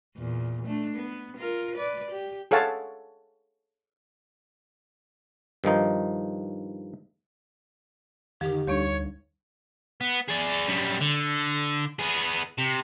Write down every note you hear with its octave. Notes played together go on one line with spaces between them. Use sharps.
E2 A#2
A3 D4
B3
F4 A#4
B4 D5
G4
G#4 A4 C#5 F5 F#5 A5
G2 D#3 F3 D#4
F2 D3 D#3 G4
D2 G3 D4 D#4 C#5
B3
G#4 D5
F#2 G3
D3
B3 G#4
C3